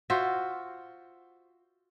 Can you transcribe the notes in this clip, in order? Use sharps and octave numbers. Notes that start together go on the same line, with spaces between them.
F4 F#4 C5 E5